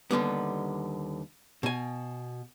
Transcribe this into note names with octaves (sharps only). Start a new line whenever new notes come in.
D#2 D3 G3 B3
B2 G#5